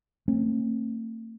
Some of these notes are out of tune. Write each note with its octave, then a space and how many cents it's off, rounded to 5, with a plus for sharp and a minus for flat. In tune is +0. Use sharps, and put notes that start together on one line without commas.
A3 +45 C4 +45